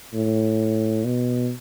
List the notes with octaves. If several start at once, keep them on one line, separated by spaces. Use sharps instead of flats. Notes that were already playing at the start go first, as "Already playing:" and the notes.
A2
B2